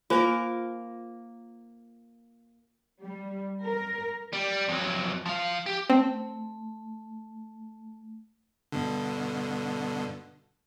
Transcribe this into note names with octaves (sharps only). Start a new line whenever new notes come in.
A#3 F4 A#4 C5 G#5
G3
A#4
G3
F2 F#3
F3 F5
G4
A3 C4
G2 B2 D3